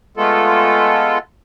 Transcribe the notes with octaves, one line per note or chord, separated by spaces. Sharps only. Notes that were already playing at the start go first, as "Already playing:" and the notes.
G#3 A3 B3 F4 A4